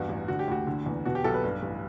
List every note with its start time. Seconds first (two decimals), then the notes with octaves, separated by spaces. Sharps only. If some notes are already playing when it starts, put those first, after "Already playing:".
Already playing: E2 G2 F#4
0.09 A1
0.28 D3 F#4
0.39 G4
0.48 D2 F#4
0.67 D3
0.86 E2
1.05 B2 F#4
1.15 G4
1.24 B1 A4
1.34 B4
1.44 G2
1.63 A1